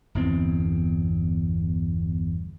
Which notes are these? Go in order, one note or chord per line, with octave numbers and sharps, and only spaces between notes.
G1 E2 C4